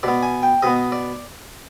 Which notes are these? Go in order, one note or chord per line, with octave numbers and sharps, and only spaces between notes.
B2 B3 D5
G#5
G5
B2 B3 D#5
D5